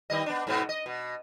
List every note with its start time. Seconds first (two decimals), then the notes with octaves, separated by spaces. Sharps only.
0.10 D#3 G3 D#5
0.26 B3 D4
0.47 G#2 B2 B3
0.69 D#5
0.86 B2